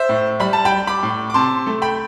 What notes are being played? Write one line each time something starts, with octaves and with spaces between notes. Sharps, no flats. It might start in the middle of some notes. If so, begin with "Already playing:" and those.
Already playing: C5 E5
A2
G3 B5
A5
G5 B5
G3
B5 D6
A2
D6
C3 A5 C6
A3
G5 B5